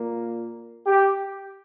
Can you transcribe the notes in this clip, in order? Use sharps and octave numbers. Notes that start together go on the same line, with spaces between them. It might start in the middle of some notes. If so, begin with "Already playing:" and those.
Already playing: A#2 A#3
G4